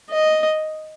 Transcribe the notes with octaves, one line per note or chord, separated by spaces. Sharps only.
D#5